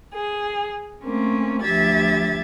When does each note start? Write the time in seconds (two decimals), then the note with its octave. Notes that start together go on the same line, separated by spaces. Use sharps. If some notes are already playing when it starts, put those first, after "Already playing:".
0.14 G#4
1.03 A3 A#3 C4 C#4
1.62 D2 F3 G4 E5 G#6 A6